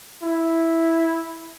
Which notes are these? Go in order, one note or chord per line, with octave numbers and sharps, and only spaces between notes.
E4